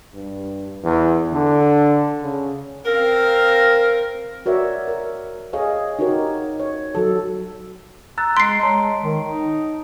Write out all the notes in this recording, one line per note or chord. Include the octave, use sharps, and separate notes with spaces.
G2
E2
D3
C#3
C4 A#4 F5
F#4 A#4 C#5 D5 E5
A#4
G#4 C#5 D#5 F5
D#4 F#4 G4 A#4 C#5
C#5
F#3 A4
A#5 E6 F#6 A6
G#3 C6 B6 C7 D7
G#3 C#5 A5 A#5
D#3
D#4